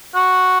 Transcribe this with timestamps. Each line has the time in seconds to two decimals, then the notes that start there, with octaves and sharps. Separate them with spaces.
0.15 F#4